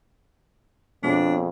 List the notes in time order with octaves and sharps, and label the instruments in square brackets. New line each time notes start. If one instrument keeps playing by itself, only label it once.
[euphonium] F2 [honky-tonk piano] B2 G#3 C#4 [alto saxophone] D4